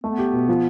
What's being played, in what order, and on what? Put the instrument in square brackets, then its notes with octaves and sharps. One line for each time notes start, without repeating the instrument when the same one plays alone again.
[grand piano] A3 [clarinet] B3
[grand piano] G4
B2
F3